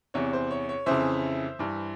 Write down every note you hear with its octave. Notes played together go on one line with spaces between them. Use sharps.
E2 C3 E3 C#5
C5
C#5
C#5
F2 C#3 E3 C5 E5
G2 E3